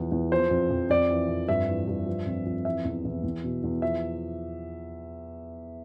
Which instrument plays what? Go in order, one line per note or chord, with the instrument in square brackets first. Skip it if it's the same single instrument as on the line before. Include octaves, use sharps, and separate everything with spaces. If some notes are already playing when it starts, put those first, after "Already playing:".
Already playing: [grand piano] E2 F3
E2
F3 C5
F2
F2
F2 D5
E3
F2
G2 E5
E3
G2
F3
F2
F2
E3 E5
E2
E2
E2
B2
E2
F3 E5